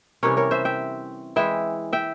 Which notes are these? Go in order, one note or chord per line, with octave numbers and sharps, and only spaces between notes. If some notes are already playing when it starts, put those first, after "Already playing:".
C3 E3 G3 C#4 A#4 C#5
A#4 C#5
C5 E5
E5 G5
E3 G#3 E4 E5 G5
E5 G5